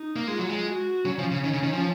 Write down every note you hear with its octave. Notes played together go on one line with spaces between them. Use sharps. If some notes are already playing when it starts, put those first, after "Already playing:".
Already playing: D#4
A#3
G#3 F4
F#3
G#3
F#4
F#3 C#4
F3
C#3
D#3
C#3
D#3
F3